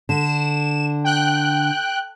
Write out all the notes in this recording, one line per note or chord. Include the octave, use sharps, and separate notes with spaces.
D3 E7
G5 F#6